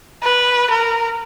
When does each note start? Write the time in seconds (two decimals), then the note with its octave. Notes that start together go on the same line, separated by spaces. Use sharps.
0.23 B4
0.71 A#4